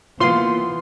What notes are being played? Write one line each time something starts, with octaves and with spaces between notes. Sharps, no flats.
E3 A#3 B3 F4 C5 C6